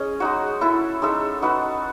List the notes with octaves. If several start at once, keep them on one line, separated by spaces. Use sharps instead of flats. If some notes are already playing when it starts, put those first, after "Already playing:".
Already playing: C#4 G#4 D#5
G#3 D#4 F#4
E4 A4 E5
G#3 D#4 A4 E5
D#4 F#4 B4